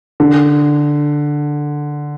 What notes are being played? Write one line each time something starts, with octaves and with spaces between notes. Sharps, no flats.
D3